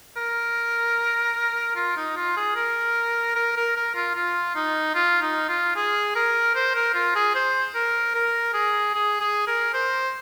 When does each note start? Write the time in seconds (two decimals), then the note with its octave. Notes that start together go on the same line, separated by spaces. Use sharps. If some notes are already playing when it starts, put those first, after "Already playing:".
0.17 A#4
1.76 F4
1.97 D#4
2.17 F4
2.37 G#4
2.56 A#4
3.36 A#4
3.56 A#4
3.76 A#4
3.95 F4
4.15 F4
4.55 D#4
4.95 F4
5.22 D#4
5.48 F4
5.76 G#4
6.15 A#4
6.56 C5
6.75 A#4
6.94 F4
7.15 G#4
7.35 C5
7.75 A#4
8.15 A#4
8.54 G#4
8.95 G#4
9.20 G#4
9.47 A#4
9.74 C5